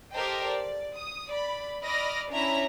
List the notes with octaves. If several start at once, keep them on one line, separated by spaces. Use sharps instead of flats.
G4 A4 A#4 C5 D#5 G5
D5
D#6
D5 B5
D5 D#5 B5 F6 A#6 D7
C#4 D4 E4 C#5 E5 A#5